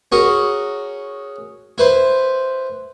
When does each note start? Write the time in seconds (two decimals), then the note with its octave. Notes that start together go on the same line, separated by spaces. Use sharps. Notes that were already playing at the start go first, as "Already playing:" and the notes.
0.12 C#4 F#4 G#4 A#4
1.78 E4 B4 C5